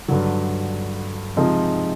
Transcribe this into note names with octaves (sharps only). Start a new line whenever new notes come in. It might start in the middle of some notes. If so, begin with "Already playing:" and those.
G2 D3 F#3
C3 F3 G#3 C4 D#4